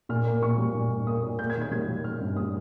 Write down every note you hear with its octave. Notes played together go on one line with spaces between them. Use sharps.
A#2 F6
A#3
A#2 C#6
G3
A#2
A#2
A#3 D#6
A#2
A#3 G6
G#6
D#3
G#6
G3 G#6
G3
A#3 F6
G2
G3 D#6